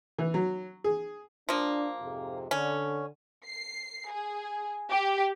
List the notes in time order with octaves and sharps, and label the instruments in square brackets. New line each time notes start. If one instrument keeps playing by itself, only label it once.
[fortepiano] E3
F#3
G#4
[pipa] F3 A#3 [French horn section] D4
[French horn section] F2 G#2 C3
[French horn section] D3 [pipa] C#4
[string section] C7
G#4
G4